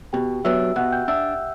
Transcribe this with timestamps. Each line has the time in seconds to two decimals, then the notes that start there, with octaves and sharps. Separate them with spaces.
0.13 B2 G4 G5
0.44 F#3 B3 D4 E5 E6
0.76 B2 F#5 F#6
0.92 G5 G6
1.08 D4 E5 E6